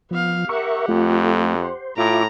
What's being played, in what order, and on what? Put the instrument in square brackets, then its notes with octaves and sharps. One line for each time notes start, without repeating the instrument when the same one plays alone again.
[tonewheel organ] F3 [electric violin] B3 F5
[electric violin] G4 F#5 [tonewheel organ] A#4 E5 C#6
[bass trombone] F2 [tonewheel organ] A3 F4
[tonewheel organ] C5
[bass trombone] A2 [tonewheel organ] F4 E5 D6 [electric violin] A#5